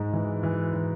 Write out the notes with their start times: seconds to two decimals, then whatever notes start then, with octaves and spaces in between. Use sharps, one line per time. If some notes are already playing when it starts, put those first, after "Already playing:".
Already playing: G#2 G#3
0.13 E3
0.43 E3
0.73 E3